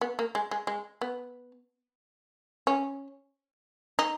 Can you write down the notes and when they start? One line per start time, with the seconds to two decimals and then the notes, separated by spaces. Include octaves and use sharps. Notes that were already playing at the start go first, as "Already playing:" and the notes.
0.01 B3
0.19 A#3
0.35 G#3
0.51 G#3
0.67 G#3
1.01 B3
2.67 C#4
3.99 D#4